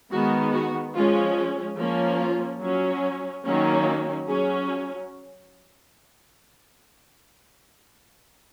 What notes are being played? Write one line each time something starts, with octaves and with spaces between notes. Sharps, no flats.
D#3 G#3 B3 F#4
F#4
F3 G#3 C#4 F4
F3 A#3 C#4
F4
F#3 C#4
D#3 F#3 A#3 C#4
F#3 C#4 G#4